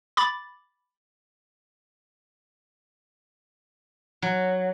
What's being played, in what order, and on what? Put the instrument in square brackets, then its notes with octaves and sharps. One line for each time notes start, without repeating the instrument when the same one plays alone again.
[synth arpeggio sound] B5 D6 A6
[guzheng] F#3